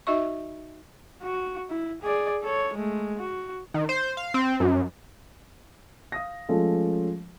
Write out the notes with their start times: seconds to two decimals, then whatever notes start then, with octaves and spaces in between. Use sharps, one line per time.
0.07 D#4 F#4 D#5 E5 C#6
1.22 F#4
1.70 E4
2.02 G#4 D5
2.42 A4 C#5
2.74 G#3 A3
3.17 F#4
3.74 D#3
3.89 C5
4.17 F5
4.34 C4
4.60 F#2
6.12 F5 D#6 A#6
6.49 F3 G#3 A3 C#4 F4 A4